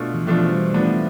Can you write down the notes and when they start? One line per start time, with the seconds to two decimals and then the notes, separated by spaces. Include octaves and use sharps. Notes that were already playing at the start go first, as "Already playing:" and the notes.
Already playing: B2 A3 D4 F4
0.14 E3
0.26 B2 F3 A3 D4 F4
0.51 G3
0.74 F3 A3 B3 D4